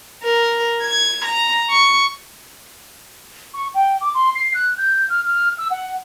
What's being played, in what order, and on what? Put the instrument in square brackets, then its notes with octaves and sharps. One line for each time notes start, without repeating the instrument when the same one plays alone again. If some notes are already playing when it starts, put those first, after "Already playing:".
[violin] A#4
G#6
A#5
C#6
[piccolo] C#6
G5
D6
C6
C7
F#6
G6
F6
F6
E6
F#5